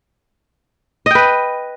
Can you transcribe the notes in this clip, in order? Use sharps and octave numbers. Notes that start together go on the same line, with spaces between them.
B4 D#5 G5